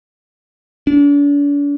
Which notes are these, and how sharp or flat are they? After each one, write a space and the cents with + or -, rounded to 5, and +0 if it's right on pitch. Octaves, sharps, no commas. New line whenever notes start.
D4 -40